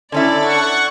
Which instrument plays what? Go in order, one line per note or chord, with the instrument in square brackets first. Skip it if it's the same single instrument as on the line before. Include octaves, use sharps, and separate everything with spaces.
[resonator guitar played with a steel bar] D3 C#4 E4 [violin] A4 D5
[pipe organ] F#5 C#6